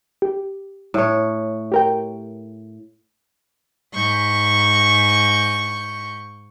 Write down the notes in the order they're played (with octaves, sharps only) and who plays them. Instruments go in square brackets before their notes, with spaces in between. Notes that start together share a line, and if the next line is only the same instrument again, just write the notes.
[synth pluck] G4
[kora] A2 C#5
[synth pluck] G4 A#4 G5
[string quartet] G#2 C#6 G6